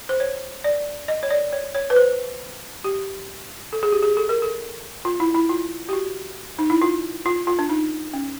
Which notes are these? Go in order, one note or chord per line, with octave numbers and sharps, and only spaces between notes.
C5
C#5
D5
D#5
C#5
D5
C#5
C#5
B4
C5
G4
A4
G#4
G4
G#4
A4
A#4
A4
F4
E4
E4
F4
G4
F#4
D#4
E4
F4
F4
F4
D4
D#4
C#4